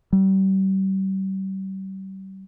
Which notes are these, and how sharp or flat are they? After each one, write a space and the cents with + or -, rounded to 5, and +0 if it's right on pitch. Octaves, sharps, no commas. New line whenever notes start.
G3 -35